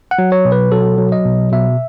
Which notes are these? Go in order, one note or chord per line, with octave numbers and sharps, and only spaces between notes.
F#5
F#3
C#5
B2
B4
F#3 A4
F#3
D#5
B2
B2 E5